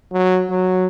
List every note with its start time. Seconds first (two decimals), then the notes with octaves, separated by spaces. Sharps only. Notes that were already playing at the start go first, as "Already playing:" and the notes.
0.13 F#3
0.50 F#3